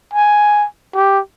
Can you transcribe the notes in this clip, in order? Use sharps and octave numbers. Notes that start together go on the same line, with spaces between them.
G#5
G4